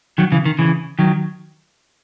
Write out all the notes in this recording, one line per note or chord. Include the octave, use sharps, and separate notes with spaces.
D#3 F#3
C#3 E3
D#3
C#3 E3
D#3 F#3